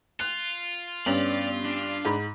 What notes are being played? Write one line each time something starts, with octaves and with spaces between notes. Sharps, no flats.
F4 F#6
G2 B3 C#4 D5 F7 F#7
D4
G#2 B5